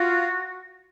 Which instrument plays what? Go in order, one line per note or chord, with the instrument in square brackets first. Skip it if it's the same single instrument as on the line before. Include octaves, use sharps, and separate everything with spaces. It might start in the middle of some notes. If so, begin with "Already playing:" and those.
Already playing: [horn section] F4 [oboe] F#4